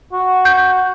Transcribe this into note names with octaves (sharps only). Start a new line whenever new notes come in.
F#4
G6